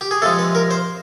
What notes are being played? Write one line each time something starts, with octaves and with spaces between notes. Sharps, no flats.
G4
G#4
C3 F3 G#3 A4
B4
A#4
C5